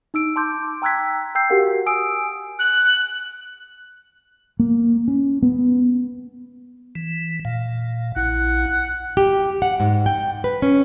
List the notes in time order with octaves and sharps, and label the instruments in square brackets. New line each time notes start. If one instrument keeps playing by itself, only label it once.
[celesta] D#4 E6 D7
A5 C6 D6 G6
G5 A#5 E6 F#6 G#6 B6
G5 E6 G6 C7
F#4 G4 A#4 F5 F#5
G#5 D#6 E6 D7
[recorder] F#6
[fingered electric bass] A#3
C#4
B3
[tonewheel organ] E3
A#2 F5
[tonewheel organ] A#1 E4 [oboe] F#5
[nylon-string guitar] G4
F#5
G#2
G5
B4
C#4